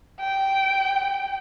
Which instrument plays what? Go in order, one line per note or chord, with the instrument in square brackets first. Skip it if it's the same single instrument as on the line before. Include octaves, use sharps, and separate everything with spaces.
[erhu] G5